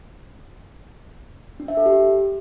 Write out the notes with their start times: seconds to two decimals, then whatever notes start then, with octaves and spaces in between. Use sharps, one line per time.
1.60 D4
1.68 E5
1.77 A4
1.86 G4